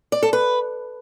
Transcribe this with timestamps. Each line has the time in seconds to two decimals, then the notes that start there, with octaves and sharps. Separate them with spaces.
0.12 D5
0.23 A4
0.33 B4